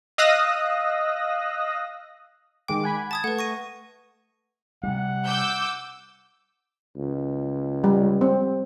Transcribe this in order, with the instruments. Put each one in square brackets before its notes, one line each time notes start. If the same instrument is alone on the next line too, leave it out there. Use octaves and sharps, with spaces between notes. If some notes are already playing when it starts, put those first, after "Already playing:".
[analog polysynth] D#5 F5 D#6 E6 F#6 A#6
[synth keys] D#3 G#3 D6 [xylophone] G5
[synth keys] F#5 G#5 B5
[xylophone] A5 D#6 G#6 [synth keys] A6
[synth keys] A3 [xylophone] B4 F#5
[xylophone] C#6 A#6 D#7
[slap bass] C3 G3 [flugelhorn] F#5
[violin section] D6 E6 G6
[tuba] C#2
[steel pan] G3
C4